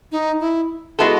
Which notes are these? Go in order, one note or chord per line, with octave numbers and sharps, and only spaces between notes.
D#4
E4
G#3 B3 E4 F#4 A4